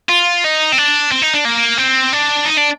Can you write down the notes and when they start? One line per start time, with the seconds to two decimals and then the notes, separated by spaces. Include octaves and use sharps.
0.09 F4
0.44 D#4
0.72 C4
0.78 D4
1.12 C4
1.22 D#4
1.34 D4
1.45 A#3
1.78 C4
2.13 D4
2.46 D#4
2.57 D4